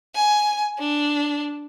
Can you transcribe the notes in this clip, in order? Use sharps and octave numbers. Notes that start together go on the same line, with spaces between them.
G#5
D4